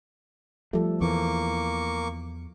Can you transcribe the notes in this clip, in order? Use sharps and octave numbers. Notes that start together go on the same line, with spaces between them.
F3 G3 A3 A4
E2 E3 A#3 C#6 D6